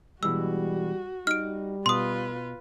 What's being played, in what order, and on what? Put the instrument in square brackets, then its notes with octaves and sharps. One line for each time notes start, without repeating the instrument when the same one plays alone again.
[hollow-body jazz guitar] B2 E3 G#3 [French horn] G3 [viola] F#4 [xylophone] E6
[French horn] G3 [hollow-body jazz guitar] D#4 [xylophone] F6 D7
[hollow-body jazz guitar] B2 [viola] F4 B4 [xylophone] C6 D#6